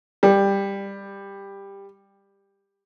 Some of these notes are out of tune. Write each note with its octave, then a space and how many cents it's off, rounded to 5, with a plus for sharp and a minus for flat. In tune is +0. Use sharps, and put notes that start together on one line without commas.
G3 +15